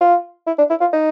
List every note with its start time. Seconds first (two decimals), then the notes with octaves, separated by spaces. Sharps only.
0.01 F4
0.47 E4
0.58 D4
0.70 E4
0.80 F4
0.93 D#4